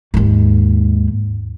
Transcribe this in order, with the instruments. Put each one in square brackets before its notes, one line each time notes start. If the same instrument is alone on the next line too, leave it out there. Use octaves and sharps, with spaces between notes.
[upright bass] D#2 G#2